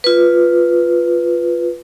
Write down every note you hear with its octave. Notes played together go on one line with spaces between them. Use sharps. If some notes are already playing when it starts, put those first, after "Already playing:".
F4 B4